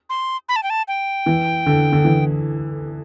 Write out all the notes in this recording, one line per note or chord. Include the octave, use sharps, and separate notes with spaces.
C6
B5
A5
G5
A5
G5
E3
D3
D3
E3